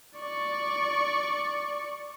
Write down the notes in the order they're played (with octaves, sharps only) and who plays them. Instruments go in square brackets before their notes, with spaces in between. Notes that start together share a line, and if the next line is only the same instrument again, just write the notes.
[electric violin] D5 C#6